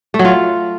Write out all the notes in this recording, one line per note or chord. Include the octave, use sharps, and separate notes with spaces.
A3
F#3
F4